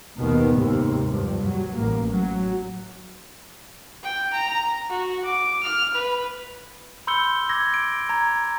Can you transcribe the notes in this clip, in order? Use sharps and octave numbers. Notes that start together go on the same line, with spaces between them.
D#2 B2 D#3 B3
D#2 G#2 C3
G2 F3
F#3
A1 A2 A#3
F#3
G5
A#5
F#4
D6
F6
B4
B5 C6 E6 G6 C#7 G7
D6 E6 G#6 A#6
D7
A#5 G#6